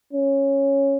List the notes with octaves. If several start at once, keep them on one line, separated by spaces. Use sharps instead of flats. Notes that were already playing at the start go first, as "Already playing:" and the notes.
C#4